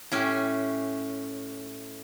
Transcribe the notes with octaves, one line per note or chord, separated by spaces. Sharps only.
A2 C#4 G4